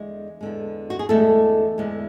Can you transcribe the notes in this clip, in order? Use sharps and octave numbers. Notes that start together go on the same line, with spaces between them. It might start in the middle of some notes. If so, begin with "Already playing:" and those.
Already playing: E2 D3 G#3
E2 D3 G#3
F#4
G#4
E2 D3 G#3 A3 A4
E2 D3 G#3